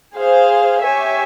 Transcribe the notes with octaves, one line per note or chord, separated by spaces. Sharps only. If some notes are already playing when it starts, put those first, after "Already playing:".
G#4 C5 F5
G4 C#5 E5 G#5